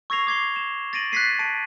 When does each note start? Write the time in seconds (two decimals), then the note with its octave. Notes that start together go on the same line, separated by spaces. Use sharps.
0.10 C#6 E6 G#6 A#6 C7 F7
0.27 D6 G#6 C7 G7
0.56 E7
0.93 A6 A#6 D7 D#7 F#7
1.12 F#6 G#6 A6 B6 C7 D#7
1.39 A5 C7 D7 D#7